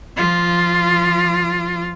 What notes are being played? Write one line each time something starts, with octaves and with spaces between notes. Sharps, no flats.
F3 F4